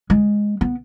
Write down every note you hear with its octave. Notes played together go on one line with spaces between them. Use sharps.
G#3
B3